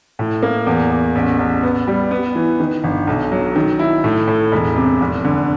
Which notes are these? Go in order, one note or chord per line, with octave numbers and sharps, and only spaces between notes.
A2
A#3
E2
E2
A1
A1
B3
G3
B3
E3
D#3
G1
B1
F#3
D#3
E4
A2
A2
E1
C3
F1
D3